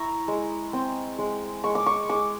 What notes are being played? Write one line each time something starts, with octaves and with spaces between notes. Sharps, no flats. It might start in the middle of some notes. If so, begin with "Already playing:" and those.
Already playing: E4 A#5 C#6
G#3
C4
G#3
G#3 C#6
D6
C#6
G#3 D6